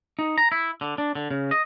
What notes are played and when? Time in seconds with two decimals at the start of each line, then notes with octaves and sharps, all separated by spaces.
0.19 D#4
0.38 A#5
0.52 E4
0.81 D3
0.98 D4
1.15 D3
1.31 C#3
1.51 D#5